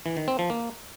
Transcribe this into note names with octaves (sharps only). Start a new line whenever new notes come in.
E3
D#3
C4
F3
A#3